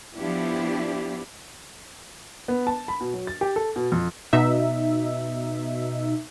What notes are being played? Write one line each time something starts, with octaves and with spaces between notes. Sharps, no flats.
F3 B3 D4 E4 G4
B3
A5
B5
B2
F#3
A6
G4
A4
B2
F2
B2 D#4 E5